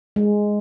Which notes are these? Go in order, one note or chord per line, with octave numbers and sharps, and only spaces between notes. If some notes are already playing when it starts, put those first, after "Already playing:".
G#3